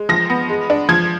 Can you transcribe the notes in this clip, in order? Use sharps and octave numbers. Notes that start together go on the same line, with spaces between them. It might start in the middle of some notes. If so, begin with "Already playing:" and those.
Already playing: G#3
F3 A#6
B3
G#3
D4
F3 G#6